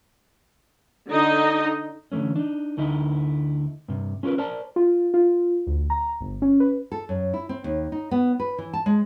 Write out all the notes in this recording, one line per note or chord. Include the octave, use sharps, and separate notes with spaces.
D3 D#4 D#5
D3 E3 G#3 A3 C#4
D4 D#4
D2 D3 D#4 E4 D#5
G2 C3
C#4 F4 F#4 A#4 B4
A#4 C5 D5 A5
F4
F4
D2
A#5
G1
C#4
B4
A4
F#2
E4
C4
D#2
D#4
B3
B4
E3
A5
G#3